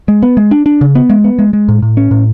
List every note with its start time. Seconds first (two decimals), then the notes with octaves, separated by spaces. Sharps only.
0.08 G#3
0.23 B3
0.37 G#3
0.51 D4
0.66 D4
0.81 C#3
0.95 B3
1.10 G#3
1.24 B3
1.39 G#3
1.53 G#3
1.68 A2
1.82 A2
1.97 C#4
2.11 A2